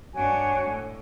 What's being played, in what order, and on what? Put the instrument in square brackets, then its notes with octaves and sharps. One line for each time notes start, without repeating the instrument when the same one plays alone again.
[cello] G2 D4 [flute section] F#4 C#5 G#5
[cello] A2